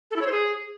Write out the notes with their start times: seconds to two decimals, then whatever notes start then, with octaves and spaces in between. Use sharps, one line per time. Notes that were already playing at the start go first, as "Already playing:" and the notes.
0.11 A4
0.16 E4
0.21 C#5
0.26 C5
0.32 G#4